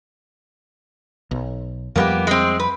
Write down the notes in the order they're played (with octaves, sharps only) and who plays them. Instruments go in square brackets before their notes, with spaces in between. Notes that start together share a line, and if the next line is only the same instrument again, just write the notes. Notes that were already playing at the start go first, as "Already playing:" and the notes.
[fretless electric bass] B1
[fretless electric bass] F2 F3 G3 [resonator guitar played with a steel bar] A#3 B3 G4
[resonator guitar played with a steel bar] G#3 C4
B4